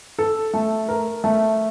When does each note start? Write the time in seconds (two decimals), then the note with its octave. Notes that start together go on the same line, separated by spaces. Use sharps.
0.19 A4
0.54 A3
0.89 A#4
1.24 A3